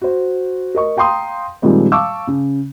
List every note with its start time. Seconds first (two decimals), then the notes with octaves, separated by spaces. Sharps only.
0.02 F#4 C5
0.75 A#4 D#5 C#6
0.97 F5 G5 A#5 C6 D#6
1.62 A#2 D#3 F3 G3 G#3 C4
1.92 F5 A5 C#6 D6 E6
2.27 C#3